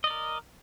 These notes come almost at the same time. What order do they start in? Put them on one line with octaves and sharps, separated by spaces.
D#5 D5 A#4